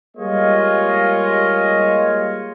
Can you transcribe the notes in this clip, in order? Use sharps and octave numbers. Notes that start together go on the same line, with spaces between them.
G3 G#3 A#3 F4 C#5 D#5